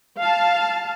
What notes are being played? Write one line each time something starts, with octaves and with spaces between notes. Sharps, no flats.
F5 A5